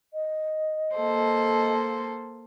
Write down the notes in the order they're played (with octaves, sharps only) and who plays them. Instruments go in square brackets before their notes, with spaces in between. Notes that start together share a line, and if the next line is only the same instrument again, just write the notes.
[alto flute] D#5
[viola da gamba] A#3 A4 C5